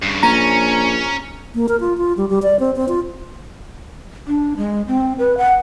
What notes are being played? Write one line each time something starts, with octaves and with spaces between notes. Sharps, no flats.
G2 C#3
A#1 C#4 A#5
A#3
A#4
F4
F4
G3
G3
D5
C4
C4
F4
D4
G#3
C4
B4
F#5